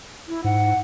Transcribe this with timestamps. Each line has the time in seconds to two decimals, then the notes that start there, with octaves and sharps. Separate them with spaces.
0.28 E4
0.44 G#2 F#5